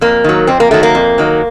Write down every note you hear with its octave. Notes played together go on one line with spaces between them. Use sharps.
F2 A#3
D#3 F#3
F2 C4
A#3
D#3 F#3 A3
A#3
F2
D#3 F#3